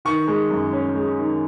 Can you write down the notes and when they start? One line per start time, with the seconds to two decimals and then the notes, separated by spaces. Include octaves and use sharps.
0.05 D#3 C#6
0.27 G#3
0.50 F#2
0.73 C#4
0.95 G#3
1.19 D#3